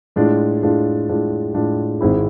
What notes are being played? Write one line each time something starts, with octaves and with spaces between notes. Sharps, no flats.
A2 G#3 D4 F4
A2 G#3 D4 F4
A2 G#3 D4 F4
A2 G#3 D4 F4
G#1 G#2 G#3 C4 E4